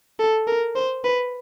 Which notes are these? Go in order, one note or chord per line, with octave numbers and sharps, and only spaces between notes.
A4
A#4
C5
B4